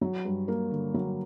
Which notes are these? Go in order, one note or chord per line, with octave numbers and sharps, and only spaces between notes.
F#3
G2
A#3
D3
F#3